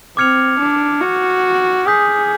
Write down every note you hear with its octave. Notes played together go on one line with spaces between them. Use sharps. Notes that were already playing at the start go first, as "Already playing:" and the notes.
C4 D6 F6 G#6 C#7 F7
D4
F#4
G#4 D#6 G6 B6